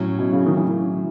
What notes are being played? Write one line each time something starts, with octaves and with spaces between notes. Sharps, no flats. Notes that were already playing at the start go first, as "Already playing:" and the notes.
Already playing: A2 F#3 C#4
B2
C#3
D#3
E3